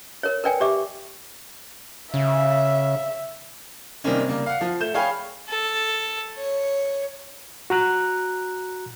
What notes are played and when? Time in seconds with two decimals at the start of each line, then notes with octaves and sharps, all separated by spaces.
0.23 A#4 C#5
0.44 A#4 B4 D5 G5 G#5
0.60 G4 D5 E5 D6
2.14 C#3 E5
4.04 C3 D#3 G3 A#3 C4 C#4
4.27 C#3 G3 A#3
4.46 F5 F#5
4.61 F3
4.80 A3 G6 E7
4.94 G#4 C#5 F5 G5 G#5 B5
5.49 A4
6.36 C#5
7.70 F#4 A#5 F#6